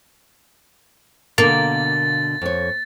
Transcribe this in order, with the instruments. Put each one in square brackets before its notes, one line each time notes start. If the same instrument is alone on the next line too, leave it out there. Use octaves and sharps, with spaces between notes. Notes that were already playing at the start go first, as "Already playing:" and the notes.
[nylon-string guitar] B2 D3 A#4 [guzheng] A#3 [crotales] A6
[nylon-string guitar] F2 C#5